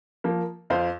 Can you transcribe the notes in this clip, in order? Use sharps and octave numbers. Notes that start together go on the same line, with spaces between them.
F3 A#3
F2 C5 F5